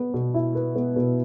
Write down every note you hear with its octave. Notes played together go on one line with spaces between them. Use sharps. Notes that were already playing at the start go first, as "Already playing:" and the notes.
Already playing: B3
B2
E4
B4
B3
B2